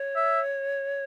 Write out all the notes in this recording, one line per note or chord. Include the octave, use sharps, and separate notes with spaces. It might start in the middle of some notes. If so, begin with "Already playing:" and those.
Already playing: C#5
E5